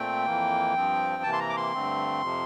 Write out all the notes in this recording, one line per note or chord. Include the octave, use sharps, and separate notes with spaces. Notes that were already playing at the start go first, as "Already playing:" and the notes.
Already playing: A#2 A3 C4 G5
F2 E3 A#3
G2 F3 C4
C3 E3 A#3 A5
C6
A#5
D6
C6
G2 D3 A3 C4
F2 C3 F3